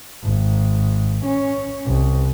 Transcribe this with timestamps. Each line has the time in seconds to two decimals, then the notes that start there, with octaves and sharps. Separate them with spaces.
0.23 G#1
1.25 C#4
1.86 C2